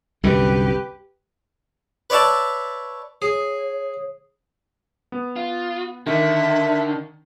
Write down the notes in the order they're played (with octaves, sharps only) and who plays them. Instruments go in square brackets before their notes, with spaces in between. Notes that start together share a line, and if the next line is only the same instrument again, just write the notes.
[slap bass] C2 F#2 D3 [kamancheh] G4 B4
[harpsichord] B4 C#5 D5 E5 A5
[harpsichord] G#4 [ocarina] C#5
[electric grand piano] B3
[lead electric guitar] F4
[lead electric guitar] D3 [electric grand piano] D#3 [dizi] E5